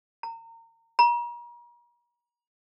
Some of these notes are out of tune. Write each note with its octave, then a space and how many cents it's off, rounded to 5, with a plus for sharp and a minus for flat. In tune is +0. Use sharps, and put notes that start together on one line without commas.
A#5 -30
A#5 +40